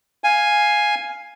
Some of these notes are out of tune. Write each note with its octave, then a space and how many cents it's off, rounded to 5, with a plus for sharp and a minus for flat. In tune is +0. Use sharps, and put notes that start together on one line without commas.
F5 +5 G#5 +0